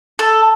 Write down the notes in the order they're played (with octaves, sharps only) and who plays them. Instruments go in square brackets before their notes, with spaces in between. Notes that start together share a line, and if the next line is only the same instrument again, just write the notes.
[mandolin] A4